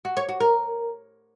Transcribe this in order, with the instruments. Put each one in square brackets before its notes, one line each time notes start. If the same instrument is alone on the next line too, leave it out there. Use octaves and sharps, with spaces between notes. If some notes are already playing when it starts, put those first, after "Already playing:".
[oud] F#4
C#5
F#4
A#4